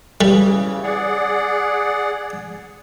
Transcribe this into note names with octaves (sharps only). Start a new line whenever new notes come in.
C#3 E3 G3
G#4 D5 F#5